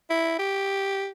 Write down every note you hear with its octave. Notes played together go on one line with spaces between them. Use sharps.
E4
G4